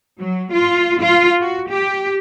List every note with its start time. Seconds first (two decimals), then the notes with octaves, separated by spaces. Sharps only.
0.19 F#3
0.52 F4
1.00 F4
1.40 F#4
1.69 G4